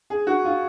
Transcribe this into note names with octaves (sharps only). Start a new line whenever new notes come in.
G#4
F#4
F4